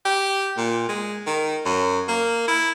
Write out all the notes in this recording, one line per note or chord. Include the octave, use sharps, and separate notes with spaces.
G4
A#2
G#3
D#3
F#2
A#3
E4